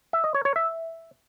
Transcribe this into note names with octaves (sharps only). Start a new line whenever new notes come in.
E5
D#5
C#5
C#5
E5